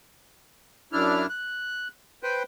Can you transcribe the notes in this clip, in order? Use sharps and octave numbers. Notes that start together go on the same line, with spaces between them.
F#2 D4 E4 F6
F#6
B4 C5 G5